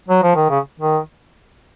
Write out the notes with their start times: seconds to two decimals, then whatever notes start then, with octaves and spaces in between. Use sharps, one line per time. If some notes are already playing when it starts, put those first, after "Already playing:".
0.09 F#3
0.23 F3
0.36 D#3
0.50 C#3
0.80 D#3